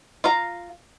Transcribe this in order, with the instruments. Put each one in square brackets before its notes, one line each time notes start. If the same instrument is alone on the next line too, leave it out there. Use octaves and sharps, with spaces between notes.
[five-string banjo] F4 F5 A#5